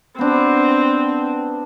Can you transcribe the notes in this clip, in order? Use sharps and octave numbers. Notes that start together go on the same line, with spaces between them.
B3 C4 D4